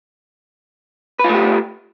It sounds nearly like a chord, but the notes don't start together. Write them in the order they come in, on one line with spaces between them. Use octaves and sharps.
B4 F4 A3 G4